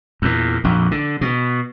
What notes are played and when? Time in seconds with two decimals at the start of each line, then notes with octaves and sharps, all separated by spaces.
0.22 E2 A#2
0.64 A#1 F2
0.91 D3
1.21 B2